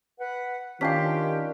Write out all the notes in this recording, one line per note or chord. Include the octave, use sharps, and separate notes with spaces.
B4 F#5
D#3 C#4 D4 F4 G4 F5 G5 B6